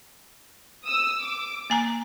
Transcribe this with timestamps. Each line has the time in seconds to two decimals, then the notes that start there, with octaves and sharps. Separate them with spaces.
0.85 D#6 E6
1.22 D6
1.70 A#3 G#5 A#5